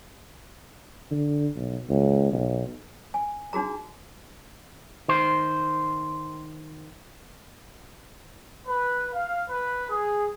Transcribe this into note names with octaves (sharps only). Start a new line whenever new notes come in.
D3
B1
C#2
B1
G#5
D4 D#4 F#4 G#4 A#5
D#3 C5
B4
F5
B4
G#4